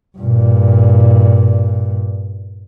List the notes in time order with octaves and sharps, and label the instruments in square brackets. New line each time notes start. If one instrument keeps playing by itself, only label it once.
[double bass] G2 A#2